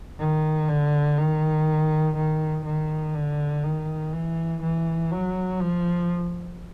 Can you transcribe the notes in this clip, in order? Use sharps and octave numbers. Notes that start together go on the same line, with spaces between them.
D#3
D3
D#3
D#3
D#3
D3
D#3
E3
E3
F#3
F3